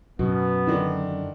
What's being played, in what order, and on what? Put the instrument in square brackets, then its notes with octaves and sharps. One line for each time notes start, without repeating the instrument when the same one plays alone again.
[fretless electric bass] F#2 [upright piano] B2 [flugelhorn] B3
[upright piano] D3 D#3 D4